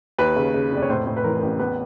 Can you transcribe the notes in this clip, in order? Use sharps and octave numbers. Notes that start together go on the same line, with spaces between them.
D#2 B4
C#3
C#3
F1 D5
C#5
A2 C5
A2
B4
E3 A#4
A#4
A1
E2 B4